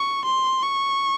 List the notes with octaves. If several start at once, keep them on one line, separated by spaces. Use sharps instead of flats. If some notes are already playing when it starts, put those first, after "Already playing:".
Already playing: C#6
C6
C#6